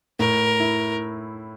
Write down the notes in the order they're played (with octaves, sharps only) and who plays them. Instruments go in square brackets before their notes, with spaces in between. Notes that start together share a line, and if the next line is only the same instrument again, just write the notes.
[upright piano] A2 [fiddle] A#4
[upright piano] E4